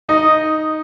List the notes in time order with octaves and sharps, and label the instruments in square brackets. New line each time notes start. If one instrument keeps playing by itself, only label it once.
[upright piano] D#4 [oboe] D#5